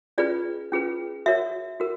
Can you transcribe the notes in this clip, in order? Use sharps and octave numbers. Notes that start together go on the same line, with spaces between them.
C#4 F4 G#4 B4 D5
C#4 F4 G#4 B4
F#4 A#4 C#5 E5
F#4 A#4